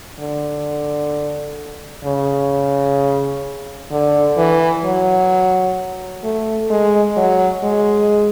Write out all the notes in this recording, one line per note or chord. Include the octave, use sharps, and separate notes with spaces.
D3
C#3
D3
E3
F#3
A3
G#3
F#3
G#3